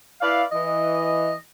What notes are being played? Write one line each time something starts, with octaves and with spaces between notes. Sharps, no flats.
E4 B4 D5 F5
E3 D#5